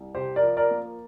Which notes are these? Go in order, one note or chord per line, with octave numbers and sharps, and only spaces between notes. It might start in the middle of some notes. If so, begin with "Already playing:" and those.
Already playing: C2
C3 G4 C5
A#4 D5
F3
A#4 D5
A#3